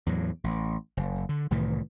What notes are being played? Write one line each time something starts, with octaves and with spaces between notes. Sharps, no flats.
E2 A2 F#3
A1
F#1
D3
C2 A2 D#3 E3